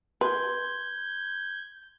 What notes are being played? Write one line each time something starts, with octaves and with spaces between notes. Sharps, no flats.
B4 C6 G6 G#6